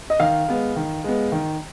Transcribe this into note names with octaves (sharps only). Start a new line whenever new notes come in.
D#5
D#3 F5
G#3 B3
D#3
G#3 B3
D#3